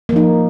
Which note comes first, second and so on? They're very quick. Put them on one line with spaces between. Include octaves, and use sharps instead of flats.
A#3 F3 D#4